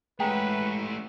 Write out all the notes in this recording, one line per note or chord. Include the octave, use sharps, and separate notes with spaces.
G#3 A3 C#4 G#4 B4 F#5 G5 A#5